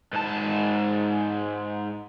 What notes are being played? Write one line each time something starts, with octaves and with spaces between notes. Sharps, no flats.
G#2 A5